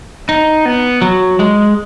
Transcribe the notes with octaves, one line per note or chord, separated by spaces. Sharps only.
D#4
B3
F#3
G#3